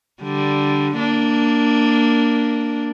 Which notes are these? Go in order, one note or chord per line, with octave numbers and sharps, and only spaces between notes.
D3 G3
A#3 D4